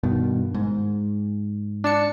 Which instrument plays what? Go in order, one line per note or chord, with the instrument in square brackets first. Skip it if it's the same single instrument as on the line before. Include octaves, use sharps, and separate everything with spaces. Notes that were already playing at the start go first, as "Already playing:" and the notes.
[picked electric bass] G2 B2 D#3
G#2
[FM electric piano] D4 A5 C#7